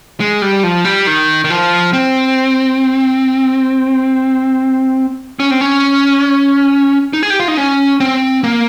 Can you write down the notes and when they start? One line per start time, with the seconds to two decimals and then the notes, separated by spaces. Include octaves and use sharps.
0.20 G#3
0.42 G3
0.64 F3
0.85 G3
1.07 D#3
1.44 D#3
1.50 F3
1.93 C4
5.40 C#4
5.51 C4
5.61 C#4
7.13 D#4
7.23 G#4
7.30 G4
7.40 F4
7.48 D#4
7.57 C#4
8.00 C4
8.44 A#3